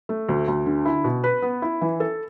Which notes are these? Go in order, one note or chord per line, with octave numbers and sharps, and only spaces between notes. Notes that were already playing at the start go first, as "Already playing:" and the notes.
A3
D2
D2
D3
E4
B2
B4
B3
E4
E3
A4